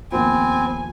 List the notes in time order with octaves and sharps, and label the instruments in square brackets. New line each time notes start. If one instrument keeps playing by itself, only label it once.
[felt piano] D#2 F3 [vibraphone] B3 [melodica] C4 [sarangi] G#5